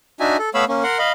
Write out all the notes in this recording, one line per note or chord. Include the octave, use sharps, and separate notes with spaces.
D4 D#4 F#4 E5 G#5
A4
A3 B3 C#5 F5 B5 E6
A#3 C#4
A#4 F#5 C6
D#5 F5 B5